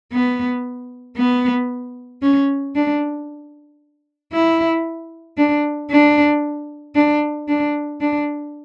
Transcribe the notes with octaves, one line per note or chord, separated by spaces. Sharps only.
B3
B3
C#4
D4
E4
D4
D4
D4
D4
D4